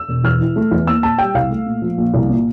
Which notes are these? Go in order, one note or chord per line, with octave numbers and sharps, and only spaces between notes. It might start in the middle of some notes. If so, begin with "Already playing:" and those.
Already playing: E6
E1
E2 F6
E3
A3
E2
A#3 E6
A#2 A5
G3 G5
C2 F5
A3
A#2
F3
A#1
C2
A#2